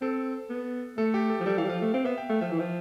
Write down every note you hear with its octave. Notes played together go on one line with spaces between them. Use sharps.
C4 A4
B3
A3 A4
G4
A4
F3
G3 A4
E3 F5
G3
F3 F5
A3
C4 F5
B3 E5
G5
A3 F5
F3 E5
E3
F3